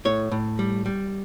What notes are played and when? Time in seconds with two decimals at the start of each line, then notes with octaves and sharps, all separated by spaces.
0.05 A2 C#5
0.32 A2
0.59 G3
0.86 G3